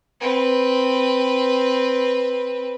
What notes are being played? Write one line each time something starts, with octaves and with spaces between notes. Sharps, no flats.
C4 B4